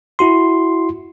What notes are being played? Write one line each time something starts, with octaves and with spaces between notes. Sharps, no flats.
E4 F#4 C6